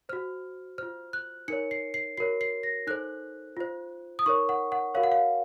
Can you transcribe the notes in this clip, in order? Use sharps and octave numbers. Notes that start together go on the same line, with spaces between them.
F#4 C5 F6
F4 C5 F6
F#6
D#4 A#4 C#5 C#7
C7
C7
F#4 A#4 C#5 C7
C7
A#6
D#4 A4 C5 F#6
F4 C5
D#6
D#4 A#4 C#5 C#6
F#5
F#5
F#4 A#4 C#5 F5
F#5
F5